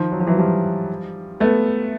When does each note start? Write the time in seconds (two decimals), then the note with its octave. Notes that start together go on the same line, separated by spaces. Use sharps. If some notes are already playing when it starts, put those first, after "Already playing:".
Already playing: D#3 F3
0.12 F#3
0.20 F3
0.27 E3 F#3
0.38 F3 G3
1.40 A3 B3